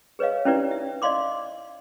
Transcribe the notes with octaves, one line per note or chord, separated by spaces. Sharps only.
G#4 B4 C#5 D#5 F5
C#4 D#4 E4 G4 B4 D5
E5
D5 D#5 F5 C6 D6